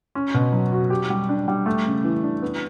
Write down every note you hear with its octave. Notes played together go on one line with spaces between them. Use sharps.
C#4
B2
F#3
F#4
G4
G3
D4
G3
A3
C#3
E3
D4
B3